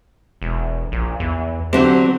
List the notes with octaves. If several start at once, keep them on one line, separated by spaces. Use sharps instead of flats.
E1
A#1
E2
D3 F#3 C4 G4